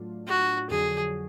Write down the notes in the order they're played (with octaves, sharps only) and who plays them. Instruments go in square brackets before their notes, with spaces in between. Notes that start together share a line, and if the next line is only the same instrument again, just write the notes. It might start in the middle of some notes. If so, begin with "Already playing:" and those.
Already playing: [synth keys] A2 F#3 A3 D4 F4
[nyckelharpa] F#4
[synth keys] F2 D3 F#3 [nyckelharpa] G#4